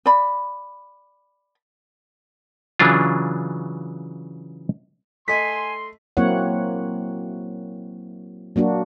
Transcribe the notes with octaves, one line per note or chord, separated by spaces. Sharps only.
D5 B5
C#3 E3 F#3 D4 F4
A3 D#5 G#5 C6 B6
F#3 A#3 C4 E4 C#5 F#5
F#3 A#3 D4 F#4